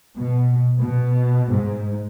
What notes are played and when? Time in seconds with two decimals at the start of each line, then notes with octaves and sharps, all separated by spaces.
0.16 B2
0.80 B2
1.51 G#2